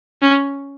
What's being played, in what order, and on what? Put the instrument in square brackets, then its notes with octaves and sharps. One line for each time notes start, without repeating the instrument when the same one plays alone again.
[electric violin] C#4